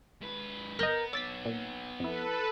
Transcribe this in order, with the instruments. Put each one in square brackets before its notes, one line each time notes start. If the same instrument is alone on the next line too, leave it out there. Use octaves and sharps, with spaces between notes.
[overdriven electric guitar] G#2 B4
[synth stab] G1 D#5 [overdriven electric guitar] B3 [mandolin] A#4 G6
[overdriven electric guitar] B3 C#5 [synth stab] D6 A6 B6 [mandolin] E6
[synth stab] A#2
[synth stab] F2 E4 [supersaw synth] A4 B4